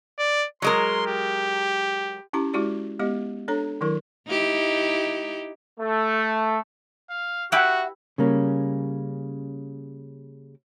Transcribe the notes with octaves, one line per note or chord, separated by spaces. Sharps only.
D5
F#3 G#3 A#4 C6
G4
C#4 E4 G4 A#5
G#3 E4 F#4 G4 D5
G#3 B3 G4 D#5
D4 A4 C#5 A#5
D#3 F#3 E4 A#4
D#4 E4 G4
A3
F5
E4 F#4 G4 B4 E5 F#5
C#3 G3 A#3 C#4